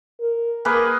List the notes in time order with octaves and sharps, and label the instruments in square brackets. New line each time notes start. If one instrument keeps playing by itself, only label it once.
[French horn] A#4
[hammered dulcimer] A#3 G#4 B4